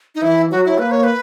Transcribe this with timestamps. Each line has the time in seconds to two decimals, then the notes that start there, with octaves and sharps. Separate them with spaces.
0.15 D#4
0.22 E3 E4
0.51 F#3 F#4
0.65 E4
0.78 A#3 B4
0.92 C#5
1.04 B4